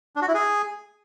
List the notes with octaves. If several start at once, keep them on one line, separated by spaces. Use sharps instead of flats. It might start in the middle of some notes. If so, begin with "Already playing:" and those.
D4
F#4
E4
G#4